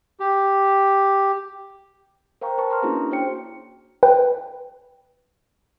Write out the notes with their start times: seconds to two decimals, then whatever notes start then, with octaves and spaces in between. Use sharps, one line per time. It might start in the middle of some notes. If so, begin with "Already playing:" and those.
0.20 G4
2.41 A#4 C5 F5 G5 A#5 C#6
2.58 B4 A5 C#6
2.70 A#5 C6 F6
2.83 A#3 C#4 D4 E4 F#4 G#4
3.11 F#4 C5 C#5 G5 C#7
4.03 B4 G5